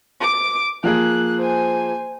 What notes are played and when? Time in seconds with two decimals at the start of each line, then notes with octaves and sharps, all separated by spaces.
0.21 D6 D7
0.84 F3 A#3 G#4 F#6
1.39 C5 G#5